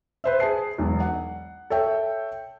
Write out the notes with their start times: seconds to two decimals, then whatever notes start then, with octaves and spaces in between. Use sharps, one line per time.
0.24 B4 C5 E5
0.40 G#4 A5 C7
0.78 E1 B1
1.00 F#5
1.70 A4 C#5 E5 G5